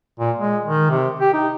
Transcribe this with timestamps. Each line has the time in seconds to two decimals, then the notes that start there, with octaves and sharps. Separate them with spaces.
0.19 A#2
0.39 G#3
0.65 D#3
0.90 C3
1.20 G4
1.33 D#4